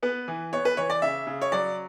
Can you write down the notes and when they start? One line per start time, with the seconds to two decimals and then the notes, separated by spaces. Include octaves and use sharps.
0.03 B3 B4
0.28 E3
0.53 B3 C#5
0.65 B4
0.77 E3 C#5
0.90 D5
1.02 C#3 E5
1.27 C#3
1.42 C#5
1.52 F#3 D5